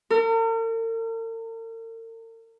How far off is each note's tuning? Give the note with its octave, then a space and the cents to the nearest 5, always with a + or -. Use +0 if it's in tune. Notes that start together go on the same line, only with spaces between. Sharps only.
A#4 -45